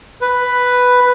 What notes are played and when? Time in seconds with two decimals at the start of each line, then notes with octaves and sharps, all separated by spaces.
0.21 B4